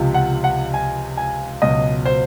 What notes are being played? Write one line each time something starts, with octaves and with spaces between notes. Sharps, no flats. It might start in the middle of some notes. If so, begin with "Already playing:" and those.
Already playing: C#2 C3 F3
F#5
F#5
G#5
G#5
C#2 B2 F#3 D#5
C5